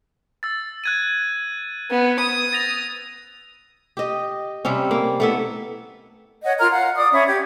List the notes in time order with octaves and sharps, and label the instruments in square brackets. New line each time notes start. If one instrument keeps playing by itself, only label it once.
[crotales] E6 A6
F#6 G#6 D#7
[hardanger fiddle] B3
D#6
[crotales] A6 A#6 F7
[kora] G4 D#5
C3 G3 C4 C#4
A#3
A3 B3 E4
[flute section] C#5 D#5 F#5
F4 A#4 A#5 F6
F5 F#5
D5 D#6
C#4 E5 B5
G4 G#6